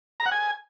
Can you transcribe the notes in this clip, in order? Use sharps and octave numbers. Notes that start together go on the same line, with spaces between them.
A#5
F#5
G#5